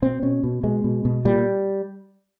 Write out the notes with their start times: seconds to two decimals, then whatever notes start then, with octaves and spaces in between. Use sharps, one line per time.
0.02 B2 C4
0.22 B2 C#4
0.44 B2
0.63 B2 G#3
0.84 B2
1.05 B2
1.25 A#2 G3